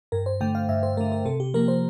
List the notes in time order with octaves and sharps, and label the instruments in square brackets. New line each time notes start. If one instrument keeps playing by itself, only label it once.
[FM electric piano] G2 A#4
C5
D3 A3 G5
F5
G2 E5
C5
D3 A3 A#4
A#4
C3 A4
G4
F3 A#3 A#4
C5